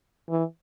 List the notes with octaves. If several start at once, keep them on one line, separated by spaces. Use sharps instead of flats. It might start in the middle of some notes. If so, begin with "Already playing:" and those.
E3